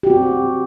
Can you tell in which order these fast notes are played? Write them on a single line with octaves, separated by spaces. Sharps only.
G4 F#4 C4